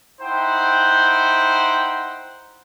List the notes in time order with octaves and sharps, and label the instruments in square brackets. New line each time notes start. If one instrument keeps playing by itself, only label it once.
[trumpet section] D#4 E4 C5 F#5 G5